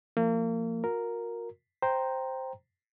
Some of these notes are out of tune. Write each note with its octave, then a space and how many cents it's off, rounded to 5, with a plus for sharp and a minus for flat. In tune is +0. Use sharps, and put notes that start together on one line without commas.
F3 -20 A#3 -35
F#4 -45 A#4 +0
C5 +0 G5 +0 A#5 +0